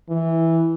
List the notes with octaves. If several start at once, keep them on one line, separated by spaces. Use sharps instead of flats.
E3